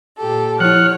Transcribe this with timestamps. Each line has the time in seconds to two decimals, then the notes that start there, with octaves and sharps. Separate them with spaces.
0.17 A#2 G4 A4
0.60 F3 E4 C#5 F#5 F6